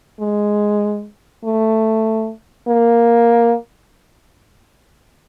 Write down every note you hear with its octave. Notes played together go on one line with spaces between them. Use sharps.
G#3
A3
A#3